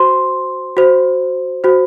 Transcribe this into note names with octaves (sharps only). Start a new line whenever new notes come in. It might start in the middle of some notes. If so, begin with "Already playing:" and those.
Already playing: F#4 C5 C6
F#4 C5
F#4 C5